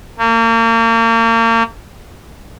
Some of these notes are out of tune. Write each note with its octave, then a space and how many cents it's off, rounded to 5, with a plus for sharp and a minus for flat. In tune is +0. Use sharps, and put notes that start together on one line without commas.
A#3 -35